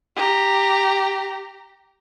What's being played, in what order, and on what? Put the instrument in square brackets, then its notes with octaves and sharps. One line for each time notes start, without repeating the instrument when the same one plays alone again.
[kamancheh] G4 A#5